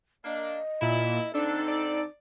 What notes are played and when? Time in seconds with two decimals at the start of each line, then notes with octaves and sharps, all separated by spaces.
0.25 A#3 D4 D#5
0.82 A#2 E4
1.34 D3 C4 D4 D#4 A4
1.68 D5